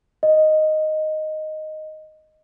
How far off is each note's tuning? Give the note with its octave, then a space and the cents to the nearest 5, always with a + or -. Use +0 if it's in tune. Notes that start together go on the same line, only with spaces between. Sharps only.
D#5 -5